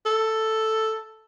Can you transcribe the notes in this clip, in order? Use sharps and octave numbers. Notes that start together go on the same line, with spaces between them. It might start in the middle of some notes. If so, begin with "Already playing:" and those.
A4